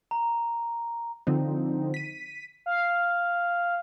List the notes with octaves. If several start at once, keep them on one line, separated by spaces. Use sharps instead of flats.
A#5
D3 F3 C4 D#4
B6 D#7
F5